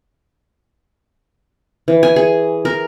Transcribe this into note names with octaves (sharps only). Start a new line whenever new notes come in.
E3
G#5
G#4
A#4